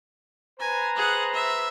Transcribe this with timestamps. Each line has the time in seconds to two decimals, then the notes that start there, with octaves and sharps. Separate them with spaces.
0.60 B4 C5 G#5 A#5
0.96 G#4 F#5
1.34 E5